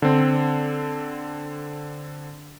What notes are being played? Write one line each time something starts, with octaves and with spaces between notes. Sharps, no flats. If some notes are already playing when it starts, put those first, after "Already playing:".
D3 C4